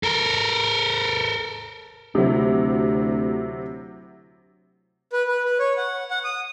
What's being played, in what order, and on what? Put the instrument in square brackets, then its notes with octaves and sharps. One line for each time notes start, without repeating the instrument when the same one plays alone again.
[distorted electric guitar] A4 A#4
[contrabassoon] D2 [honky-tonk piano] C3 F#3 E4
[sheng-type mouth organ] B4
B4
B4
C#5
F#5
F#5
D#6